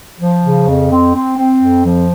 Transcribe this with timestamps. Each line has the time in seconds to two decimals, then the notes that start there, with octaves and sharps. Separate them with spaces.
0.19 F3
0.44 C#3
0.67 F2
0.90 C4
1.14 C4
1.37 C4
1.61 F2
1.84 F3